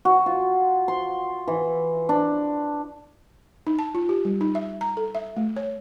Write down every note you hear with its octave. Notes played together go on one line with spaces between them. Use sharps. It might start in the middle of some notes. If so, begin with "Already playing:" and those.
F#4
F4
C6
E3
D4
D#4
A5
F4
G4
G3
D#4
E5
A#5
A4
E5
A3
C#5